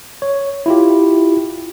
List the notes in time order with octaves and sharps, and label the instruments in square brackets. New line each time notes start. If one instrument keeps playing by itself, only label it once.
[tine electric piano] C#5
E4 F4 G4